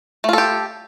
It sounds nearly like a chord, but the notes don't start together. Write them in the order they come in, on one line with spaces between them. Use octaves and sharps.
A3 F4 A4 G4